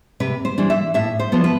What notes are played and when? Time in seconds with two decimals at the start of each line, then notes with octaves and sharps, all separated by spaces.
0.20 C3 B4
0.45 C5
0.58 E3 G3 D4
0.70 E5
0.94 A2 E5
1.20 C5
1.32 F3 B3
1.44 B4